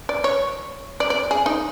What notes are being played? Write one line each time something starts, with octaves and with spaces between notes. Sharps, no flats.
D5
C#5
D5
D5
G#4
D#4